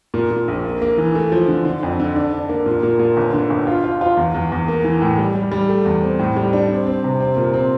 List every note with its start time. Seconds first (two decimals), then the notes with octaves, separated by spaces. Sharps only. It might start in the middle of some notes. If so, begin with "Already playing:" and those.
0.14 A#2
0.31 A#2
0.48 A#1
0.65 A#3
0.82 A#3
0.98 E3
1.15 A3
1.32 F3
1.48 D3
1.65 D3
1.83 F2
2.00 D3
2.16 D4
2.33 D4
2.49 A#3
2.66 A#2
2.83 A#2
2.99 A#2
3.17 G1
3.34 D3
3.50 G1
3.67 F4
3.84 F4
4.01 F4
4.17 E2
4.34 E2
4.52 E2
4.68 A#3
4.84 E3
5.01 A2
5.18 G3
5.35 G3
5.52 G3
5.69 A3
5.86 E2
6.02 C4
6.19 A2
6.36 G3
6.53 D4
6.70 C4
6.87 C4
7.04 C3
7.20 C4
7.37 A#2
7.54 C4